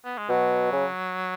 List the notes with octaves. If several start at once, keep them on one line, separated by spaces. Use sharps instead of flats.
B3
G#3
B2 F#3
C#3